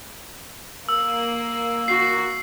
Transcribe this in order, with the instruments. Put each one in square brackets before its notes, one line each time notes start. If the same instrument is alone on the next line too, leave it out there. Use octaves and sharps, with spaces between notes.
[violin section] A#3 [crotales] E6
[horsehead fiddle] F#4 [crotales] C7